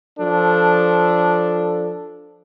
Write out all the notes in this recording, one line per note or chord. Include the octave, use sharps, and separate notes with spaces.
F3 D4 A4